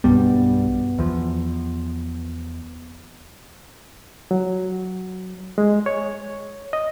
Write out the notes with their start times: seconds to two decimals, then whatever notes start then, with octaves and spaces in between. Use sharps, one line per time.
0.04 B1 G2 G3 B3
0.99 E2 F3
4.31 F#3
5.58 G#3
5.86 C#5
6.73 D#5